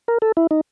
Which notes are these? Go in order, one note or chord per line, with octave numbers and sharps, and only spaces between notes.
A#4
A4
E4
D#4